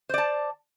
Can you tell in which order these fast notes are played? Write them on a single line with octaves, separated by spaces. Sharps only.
C5 D5 A5